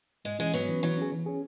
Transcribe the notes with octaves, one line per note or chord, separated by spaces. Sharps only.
G#2 G#3
E3 G#3 C#4
G#2 F#3 B3
E3 C#4
E3 F#3
C#4 G#4
E3
C#4 G#4